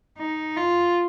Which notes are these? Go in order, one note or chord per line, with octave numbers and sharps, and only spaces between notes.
D#4
F4